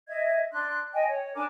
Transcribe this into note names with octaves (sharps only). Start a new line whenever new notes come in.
D#5 E5 G#6
D4 C6 F#6
D#5 G5 G#5
C#5
D4 A#4 G#5 D6